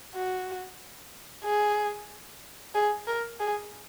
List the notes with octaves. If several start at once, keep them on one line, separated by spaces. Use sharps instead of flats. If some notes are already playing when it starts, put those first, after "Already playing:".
F#4
G#4
G#4
A#4
G#4